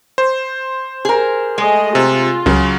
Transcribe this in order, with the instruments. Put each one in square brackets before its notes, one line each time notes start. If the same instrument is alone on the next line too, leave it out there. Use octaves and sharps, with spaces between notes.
[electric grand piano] C5
[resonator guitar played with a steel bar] G#4 A#4
[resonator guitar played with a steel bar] G#3 [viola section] A3 G#4 D#5
[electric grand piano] C3 [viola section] F4
[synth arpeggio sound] C#2 [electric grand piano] C#3 F#3